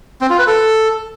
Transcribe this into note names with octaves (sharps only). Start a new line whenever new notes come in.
C4
F4
B4
A4